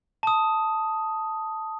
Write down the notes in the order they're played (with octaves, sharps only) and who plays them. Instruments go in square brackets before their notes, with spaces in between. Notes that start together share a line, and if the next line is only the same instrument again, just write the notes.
[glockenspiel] A5 D#6